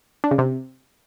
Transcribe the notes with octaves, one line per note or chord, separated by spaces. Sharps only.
D4
C#3
C3